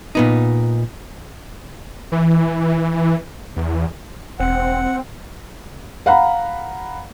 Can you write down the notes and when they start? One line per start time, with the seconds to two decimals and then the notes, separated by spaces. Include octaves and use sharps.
0.15 A#2 B3 D#4
2.12 E3
3.56 E2
4.40 E1 C4 F#5
6.06 F5 F#5 A#5 B5